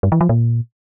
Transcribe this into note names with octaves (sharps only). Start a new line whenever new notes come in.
G2
E3
F3
A#2